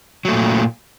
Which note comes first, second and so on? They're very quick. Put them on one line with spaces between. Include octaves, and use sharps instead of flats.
F#3 A3 A#2